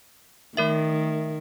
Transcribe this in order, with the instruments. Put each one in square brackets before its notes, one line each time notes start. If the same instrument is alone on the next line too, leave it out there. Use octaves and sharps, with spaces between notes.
[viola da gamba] D#3 [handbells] A3 A#4 E5